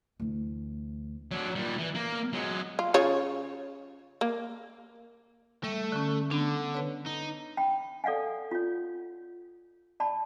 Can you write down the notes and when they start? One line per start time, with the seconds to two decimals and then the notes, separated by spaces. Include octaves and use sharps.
0.20 D2 E3
1.31 F#3 D4
1.56 A#2 G3
1.78 E3
1.95 A#3
2.33 F#3 G#3
2.79 F4
2.94 C#3 F4 C#5
4.21 A#3
5.63 G3 A3 E5
5.92 D3 C#4
6.31 D3 B3 D4
6.74 B4 C#5
7.06 D#4
7.57 G5 B5
8.04 A4 D5 F5 F#5 G#5
8.51 F4 C#5
10.00 D5 A5 B5